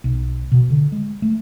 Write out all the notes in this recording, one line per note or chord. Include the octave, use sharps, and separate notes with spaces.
B1
B2
D3
G#3
A3